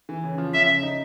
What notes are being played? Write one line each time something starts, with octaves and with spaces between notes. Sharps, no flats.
E3
C#3
F3
C#3 E5
C#3
D#4